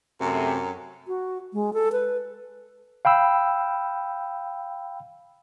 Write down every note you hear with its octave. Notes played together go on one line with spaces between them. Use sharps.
F#2 C3 A3
F#4
G#3
A4
B4
F5 G5 B5 E6